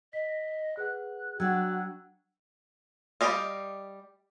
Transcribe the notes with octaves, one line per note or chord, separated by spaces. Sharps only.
D#5 B6
G#4 B4 F#5 F#6
F#3 D4 F#4 F#5 G5 E6 G#6
G3 G4 D5 D#5 F5